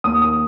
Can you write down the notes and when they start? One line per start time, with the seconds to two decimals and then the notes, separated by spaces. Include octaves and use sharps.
0.04 D#2 D#6
0.22 D#6